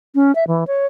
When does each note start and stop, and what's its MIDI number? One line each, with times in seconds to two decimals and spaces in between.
0.15 0.34 61
0.35 0.44 76
0.48 0.64 52
0.67 0.86 73